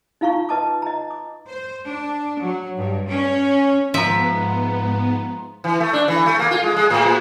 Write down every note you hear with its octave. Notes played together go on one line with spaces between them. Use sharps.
D#4 F4 F5 A#5 C#6
B4 D#5 A5 D6
D#5 A#5
D6
C5
D4
F#3
G2
C#4
G#2 F3 B3 E5 A#5 C6
E3
A3
D4
E3
A3
A#3
F4
G#3
G#3
A2
A#2